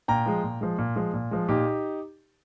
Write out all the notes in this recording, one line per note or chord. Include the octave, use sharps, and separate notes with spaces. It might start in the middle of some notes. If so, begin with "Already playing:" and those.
A#2 G5 A#5
F3 G#3
A#2
F3 G#3
A#2
F3 G#3
A#2
F3 G#3
A#2 D#4 G4